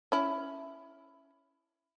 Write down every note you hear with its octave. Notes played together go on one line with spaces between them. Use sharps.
C#4 E4